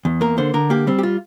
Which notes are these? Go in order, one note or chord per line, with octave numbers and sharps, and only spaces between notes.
E2
A#3 A#4
D3 C5
D3 A#4
A#3 G4
G3 C4
G4
F4